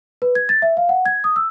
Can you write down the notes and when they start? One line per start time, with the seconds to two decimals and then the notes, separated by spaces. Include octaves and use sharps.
0.22 B4
0.35 G#6
0.49 A6
0.62 E5
0.77 F5
0.89 F#5
1.06 G#6
1.24 D#6
1.36 E6